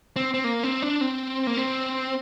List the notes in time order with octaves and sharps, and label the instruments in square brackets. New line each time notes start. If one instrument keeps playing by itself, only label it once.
[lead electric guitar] C4
C4
A#3
C4
D4
C4
A#3
C4